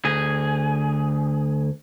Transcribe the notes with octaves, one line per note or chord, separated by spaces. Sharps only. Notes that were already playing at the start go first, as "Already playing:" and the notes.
D2 G#4